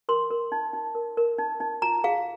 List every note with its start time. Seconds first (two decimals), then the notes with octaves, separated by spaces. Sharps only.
0.09 A#4 C6
0.31 A#4
0.52 D#4
0.73 D#4
0.95 A#4
1.17 A#4
1.39 D#4
1.60 D#4
1.82 F4 A#5
2.04 G#4 F5